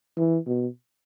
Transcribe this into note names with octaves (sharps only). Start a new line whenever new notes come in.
E3
B2